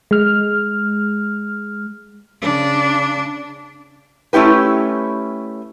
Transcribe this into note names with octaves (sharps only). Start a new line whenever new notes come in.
G#3 F6
C#3 D4
A3 C#4 E4 G4 B4